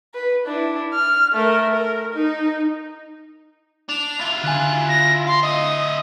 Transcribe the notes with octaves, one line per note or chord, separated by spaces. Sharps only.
B4
D4 E4
F6
A3 A#4
A#4
D#4
D4 F7
E4 F4
D3 G#5 F#6
A#6
F5 C6
E4 D#5 D#6